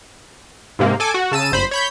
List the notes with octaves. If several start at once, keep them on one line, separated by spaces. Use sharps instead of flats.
G#2 C3 A#3
A4 G#5 D6
F#4
C#3 A5 E6 D#7
G1 C5 B5
C#5 B5 G6